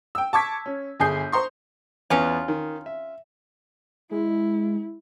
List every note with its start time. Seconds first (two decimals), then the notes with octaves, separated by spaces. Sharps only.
0.15 G5 E6
0.33 A5 C#6 D6 G#6 B6
0.66 C#4
1.00 G1 G#4 G#5 D#6 G6 C7
1.32 C5 A#5 C6 C#6
2.10 E2 B3 C#4 F4
2.48 D#3
2.86 E5
4.11 G#3 E4